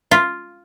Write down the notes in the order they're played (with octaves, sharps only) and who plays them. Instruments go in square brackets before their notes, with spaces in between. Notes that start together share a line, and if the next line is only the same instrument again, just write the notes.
[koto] F4